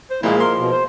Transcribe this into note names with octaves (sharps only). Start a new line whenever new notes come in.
C5
A#2 F3 G#3 A#3 E4
A#4 C6
B2
C5